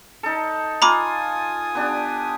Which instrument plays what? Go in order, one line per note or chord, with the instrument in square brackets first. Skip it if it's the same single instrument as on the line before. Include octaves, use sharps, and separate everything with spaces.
[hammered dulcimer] D#4 A4
[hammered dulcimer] F4 [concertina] G#5 D#6 [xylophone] A#5 B5 D6
[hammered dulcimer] B3 D4 G4